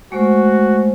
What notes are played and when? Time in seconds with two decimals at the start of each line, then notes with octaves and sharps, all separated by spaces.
0.12 G#3 A3 F#4 C5